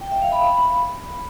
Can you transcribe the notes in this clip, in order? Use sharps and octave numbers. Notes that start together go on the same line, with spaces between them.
G5
E5
F5
B5